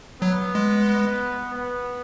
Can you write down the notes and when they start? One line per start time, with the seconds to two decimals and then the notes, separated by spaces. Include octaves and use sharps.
0.22 F#3 B3
0.55 G#3
1.54 B3